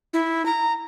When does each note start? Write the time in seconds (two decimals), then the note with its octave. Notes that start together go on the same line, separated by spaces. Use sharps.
0.13 E4
0.46 A#5